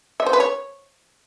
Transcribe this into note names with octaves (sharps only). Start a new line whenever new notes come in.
E5
C5
B4
C#5